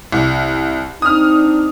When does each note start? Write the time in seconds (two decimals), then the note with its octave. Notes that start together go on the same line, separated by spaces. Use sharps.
0.12 C2
1.02 C4 D4 D#4 D#6 F6